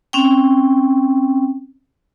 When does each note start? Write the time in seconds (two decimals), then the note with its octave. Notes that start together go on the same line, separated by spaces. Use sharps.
0.13 C4 C#4 G5